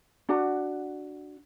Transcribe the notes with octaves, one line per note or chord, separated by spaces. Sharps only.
D4 F#4 F#5